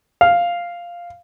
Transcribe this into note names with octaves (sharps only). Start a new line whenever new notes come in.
F5